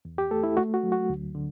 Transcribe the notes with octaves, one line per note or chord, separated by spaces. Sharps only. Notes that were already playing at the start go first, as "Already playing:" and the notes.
E2
G4
A3 A4
E4
A3 F#4
F#4
F#3
F#4
D2
D3